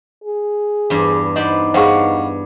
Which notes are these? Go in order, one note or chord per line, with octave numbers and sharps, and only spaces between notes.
G#4
E2 G2
B3 D#4 C5 D5 D#5 D6
G2 G#4 C5 F5 F#5 C#6